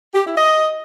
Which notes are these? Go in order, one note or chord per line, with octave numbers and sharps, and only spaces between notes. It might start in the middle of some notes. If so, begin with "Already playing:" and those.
G4
E4
D#5